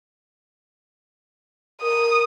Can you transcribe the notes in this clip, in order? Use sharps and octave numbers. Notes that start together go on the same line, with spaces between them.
A#4 D#6